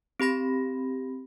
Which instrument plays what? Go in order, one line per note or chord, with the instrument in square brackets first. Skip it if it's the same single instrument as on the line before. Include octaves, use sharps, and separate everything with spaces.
[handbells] C4 G4 B5 A#6